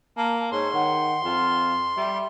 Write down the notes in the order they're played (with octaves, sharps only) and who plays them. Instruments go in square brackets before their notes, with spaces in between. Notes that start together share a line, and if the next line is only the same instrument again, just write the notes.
[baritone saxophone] A#3 [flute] A5
[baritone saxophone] G#2 [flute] C#5 [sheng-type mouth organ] C6
[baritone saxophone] D#3 [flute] F#5
[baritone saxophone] F2 [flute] F4
[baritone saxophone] G3 [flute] E5